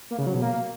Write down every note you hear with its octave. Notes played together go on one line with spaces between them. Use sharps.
A#3
C#3
F#3
B2
A#3